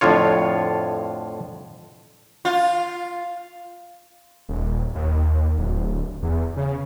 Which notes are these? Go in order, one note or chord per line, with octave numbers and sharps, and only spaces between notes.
F2 A2 D3 F4 C#5
F4
D#1
D#2
D1
E2
C#3